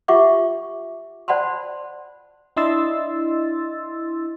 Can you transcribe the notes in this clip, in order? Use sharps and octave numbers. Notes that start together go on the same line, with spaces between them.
F4 G4 E5 F#5 C#6 D6
C5 D5 F#5 A5 B5 C6
D4 E4 D#5 C6 E6 A6